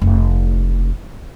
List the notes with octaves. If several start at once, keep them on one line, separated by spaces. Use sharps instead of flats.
F1